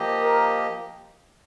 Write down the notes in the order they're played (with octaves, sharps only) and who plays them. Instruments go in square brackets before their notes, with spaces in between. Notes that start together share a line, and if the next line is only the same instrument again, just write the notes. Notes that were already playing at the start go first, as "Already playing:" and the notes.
Already playing: [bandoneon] F3 A#3 G4 D#5
[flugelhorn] A#4